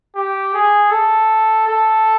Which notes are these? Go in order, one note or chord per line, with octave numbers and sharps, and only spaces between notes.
G4
G#4
A4
A4